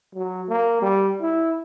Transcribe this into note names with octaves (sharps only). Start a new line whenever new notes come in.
F#3
A#3
G3
E4